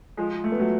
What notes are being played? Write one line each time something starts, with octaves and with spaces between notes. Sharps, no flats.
F3 G#3
A3
B3
F#3 A3